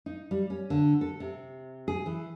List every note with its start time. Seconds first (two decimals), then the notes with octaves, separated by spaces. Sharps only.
0.06 D#4
0.31 G3
0.50 C#4
0.70 D3
1.01 A4
1.20 C3
1.88 G#4
2.06 E3